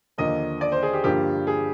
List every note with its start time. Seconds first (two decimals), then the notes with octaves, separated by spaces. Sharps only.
0.18 D#2 D3 F3 A#3 D#5
0.61 D5
0.72 C5
0.83 G#4
0.94 G4
1.04 G2 D3 F3 A#3 G4
1.47 G#4